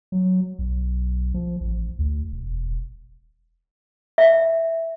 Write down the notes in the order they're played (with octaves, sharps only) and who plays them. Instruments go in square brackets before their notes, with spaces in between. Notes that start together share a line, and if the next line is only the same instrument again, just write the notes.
[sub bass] F#3
B1
F3
A1
D2
E1
[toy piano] E5